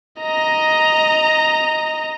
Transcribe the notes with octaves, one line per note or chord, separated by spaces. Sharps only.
D#5 A#5